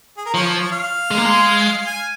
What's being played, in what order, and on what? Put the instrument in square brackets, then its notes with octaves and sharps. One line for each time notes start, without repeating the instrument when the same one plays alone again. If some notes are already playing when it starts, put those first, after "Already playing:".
[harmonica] G#4
A#4
[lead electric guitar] F3 [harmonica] C#5
[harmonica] F5
[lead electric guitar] G#3
A#3
G#3
[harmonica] G#5